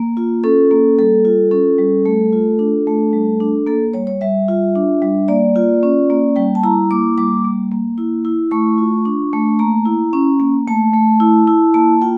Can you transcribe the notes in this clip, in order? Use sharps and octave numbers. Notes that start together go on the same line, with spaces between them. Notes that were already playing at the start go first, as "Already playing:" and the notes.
Already playing: A#3
F4
C#4 A4
A#3
G3 A4
F4
C#4 A4
G3
A3
F4
D4
A3
G3
D4
A#3 A4
G3 C#5
C#5
G3 E5
F4
D4
G3
A#3 D5
F4
C#4
A#3
G3 G5
A5
E4 A#5
A#3 D6
G3 D6
A#3
A#3
E4
E4
A3 C#6
F4
D4
A3
A#3 A#5
E4
C#4
A#3
A3 A5
A3
E4
E4
A#3 A5
F4 G5